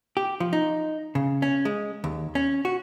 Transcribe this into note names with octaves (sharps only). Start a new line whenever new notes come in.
G4
F3
D#4
C#3
C#4
G#3
D#2
C#4
F#4